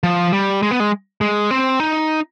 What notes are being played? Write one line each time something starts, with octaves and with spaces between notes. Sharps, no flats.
F3
G3
G#3
B3
G#3
G#3
C4
D#4